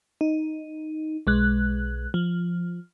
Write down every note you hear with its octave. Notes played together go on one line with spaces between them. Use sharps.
D#4
B1 G#3 F#6
F3